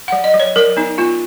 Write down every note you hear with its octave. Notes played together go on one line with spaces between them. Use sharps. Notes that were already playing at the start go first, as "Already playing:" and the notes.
F#3 F#5
D#5
F#3
C#5
F#3 A#4
B3 D#4
B3 F4